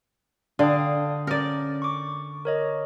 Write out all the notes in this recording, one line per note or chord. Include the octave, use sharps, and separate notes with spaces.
D3 F5 G5 D#6
C#4 A#4 D5
C#6 D6
A#4 C#5 D#5